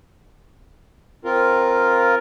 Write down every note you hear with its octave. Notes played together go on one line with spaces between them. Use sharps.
C4 F4 A#4